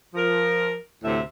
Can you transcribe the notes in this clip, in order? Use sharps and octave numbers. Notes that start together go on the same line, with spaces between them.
F3 A#4
D2 A2 C3 E5